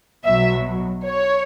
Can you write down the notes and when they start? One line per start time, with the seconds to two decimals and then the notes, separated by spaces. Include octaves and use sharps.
0.24 B1 B2 F#3 E5
1.04 C#5